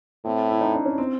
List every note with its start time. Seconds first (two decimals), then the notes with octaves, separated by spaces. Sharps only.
0.25 A2 C4
0.49 E4
0.61 D#4
0.74 D4
0.86 C#4
0.98 C4